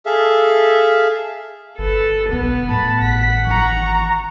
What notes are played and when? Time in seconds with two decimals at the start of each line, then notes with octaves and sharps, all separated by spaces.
0.06 G#4 A4 E5 F5
1.78 G1 A4 B4
2.29 E1 A#3 B3
2.69 A2 A5 B5
3.01 G#1 F#5 B6
3.47 E3 A#5 C#6